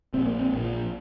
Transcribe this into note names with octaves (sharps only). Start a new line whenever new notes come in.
A#1 A#2 C4
A#3
C4
A#1 A#2
F3